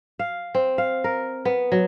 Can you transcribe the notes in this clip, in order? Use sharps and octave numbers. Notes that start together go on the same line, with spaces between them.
F5
C4
F5
A#4
B3
F#3